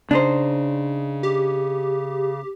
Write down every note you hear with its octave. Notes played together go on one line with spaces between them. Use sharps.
C#3 D4 D#4 C5
G4